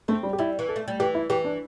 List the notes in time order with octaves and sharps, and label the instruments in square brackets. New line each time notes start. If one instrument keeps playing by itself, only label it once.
[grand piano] A3 [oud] C4
[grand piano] G3
G4
[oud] G3 [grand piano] E4
[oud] E3
[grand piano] A4
[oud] A3
G3
[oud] E3 [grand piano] G4
[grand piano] E4
[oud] E3 [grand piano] G4
[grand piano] D4